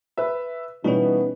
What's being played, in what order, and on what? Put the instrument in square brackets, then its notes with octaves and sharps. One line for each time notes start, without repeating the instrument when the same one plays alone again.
[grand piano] B4 E5
[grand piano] B2 G3 [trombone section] E3 B3 [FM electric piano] C#4 D#4